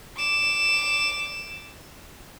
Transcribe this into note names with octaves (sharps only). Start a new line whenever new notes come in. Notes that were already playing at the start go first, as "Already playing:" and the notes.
D6 E7